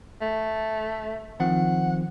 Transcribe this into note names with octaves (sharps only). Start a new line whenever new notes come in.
A3
D#3 F3 C4 F#5